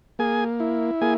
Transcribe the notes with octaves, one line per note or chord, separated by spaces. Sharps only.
A#3 G#4 G#5
E4
A#3 G#4 G#5